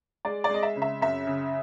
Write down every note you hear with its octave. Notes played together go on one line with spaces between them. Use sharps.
G#3 D5
D5
G#3 D#5
E5
C#3
E5
F#2 E5
C#3